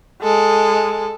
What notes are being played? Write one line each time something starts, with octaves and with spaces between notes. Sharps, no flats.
G#3 A4